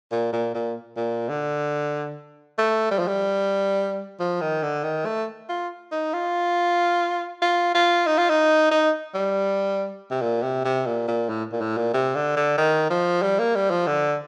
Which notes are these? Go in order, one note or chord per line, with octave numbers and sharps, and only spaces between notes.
A#2
A#2
A#2
A#2
D3
A3
G3
F3
G3
F3
D#3
D3
D#3
A3
F4
D#4
F4
F4
F4
D#4
F4
D#4
D#4
G3
C3
A#2
C3
C3
A#2
A#2
A2
A#2
A2
A#2
C3
D3
D3
D#3
F3
G3
A#3
G3
F3
D3